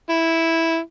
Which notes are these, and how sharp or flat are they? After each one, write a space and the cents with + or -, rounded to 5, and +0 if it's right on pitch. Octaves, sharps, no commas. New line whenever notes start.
E4 -5